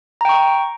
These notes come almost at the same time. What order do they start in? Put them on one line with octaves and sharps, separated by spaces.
A#5 G5 C#6